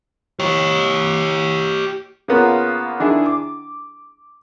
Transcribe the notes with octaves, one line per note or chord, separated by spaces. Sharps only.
G4 C#5
C#3 A#3 B3 C#4 F4 A#4
D#3 D4 E4 G#4
D6